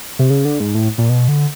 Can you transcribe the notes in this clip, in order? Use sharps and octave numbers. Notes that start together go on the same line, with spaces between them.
C3
C#3
D3
G#2
A2
A#2
B2
D3